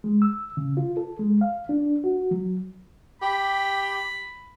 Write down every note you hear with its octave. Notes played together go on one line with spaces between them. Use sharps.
G#3
E6
C#3
F4
A4
G#3
F5
D4
F#4
F#3
G4 B5